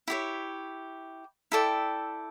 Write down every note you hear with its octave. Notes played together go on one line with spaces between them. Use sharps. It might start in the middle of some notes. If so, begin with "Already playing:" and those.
E4 G4 C#5
E4 A4 D5 G5